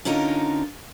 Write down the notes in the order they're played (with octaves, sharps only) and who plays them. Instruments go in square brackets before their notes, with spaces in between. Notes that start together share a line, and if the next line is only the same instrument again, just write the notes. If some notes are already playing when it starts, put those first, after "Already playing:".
[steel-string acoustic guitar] D3 C#4 D#4 F4 A#4